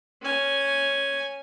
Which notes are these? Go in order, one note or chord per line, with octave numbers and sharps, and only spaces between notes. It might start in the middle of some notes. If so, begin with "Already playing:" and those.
C#4 G#5